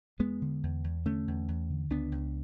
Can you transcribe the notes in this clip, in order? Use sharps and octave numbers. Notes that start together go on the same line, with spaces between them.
E2 G#3 B3
D3
E2
E2
D3 A3 C#4
E2
E2
D3
C#2 B3 D4
C#2